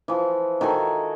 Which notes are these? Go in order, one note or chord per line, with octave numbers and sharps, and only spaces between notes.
E3 F3
D#3 F#4 A4 G#5